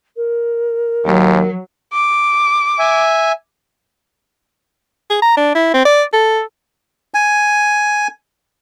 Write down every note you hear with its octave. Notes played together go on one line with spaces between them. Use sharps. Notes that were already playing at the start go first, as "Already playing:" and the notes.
A#4
D#2 F#3
D6
E5 G#5
G#4
A#5
D4
E4
C4
D5
A4
G#5